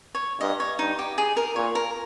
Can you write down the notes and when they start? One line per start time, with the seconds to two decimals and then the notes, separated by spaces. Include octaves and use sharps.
0.15 C#5
0.40 G2 D#5
0.60 C#5
0.79 G2 D#4
0.99 G4
1.18 G#4
1.37 A#4
1.56 A#2 C#5
1.75 A#4